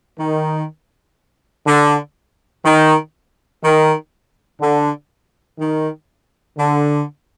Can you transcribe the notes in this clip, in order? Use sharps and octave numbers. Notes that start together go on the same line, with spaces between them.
D#3
D3
D#3
D#3
D3
D#3
D3